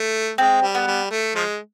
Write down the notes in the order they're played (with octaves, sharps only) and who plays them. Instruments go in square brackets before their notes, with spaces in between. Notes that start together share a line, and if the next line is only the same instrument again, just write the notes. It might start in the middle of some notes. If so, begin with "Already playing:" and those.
Already playing: [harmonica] A3
[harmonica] G#3 [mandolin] C4
[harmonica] G3
[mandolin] B3
[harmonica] G3
A3
F3 G#3